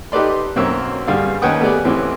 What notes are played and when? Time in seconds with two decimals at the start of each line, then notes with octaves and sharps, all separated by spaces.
0.12 D#4 G4 A4 B4 D5 C6
0.56 B1 F#2 A#3 C4 C#5 E6
1.07 G2 D3 G3 G#4 F5
1.42 D#2 C#4 B4 F#5 G5 D#6
1.61 A3 B3 G4 G#4 D5
1.85 A2 E3 C4 C#4 G4